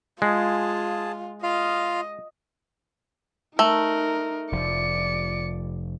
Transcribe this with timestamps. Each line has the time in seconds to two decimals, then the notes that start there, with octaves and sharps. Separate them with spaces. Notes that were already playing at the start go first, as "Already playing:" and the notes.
0.22 G#3 F4 G#4 A5
1.43 F4 D#5 F5
3.59 A3 D#4 A#4
4.52 F1 F3 D5 C#7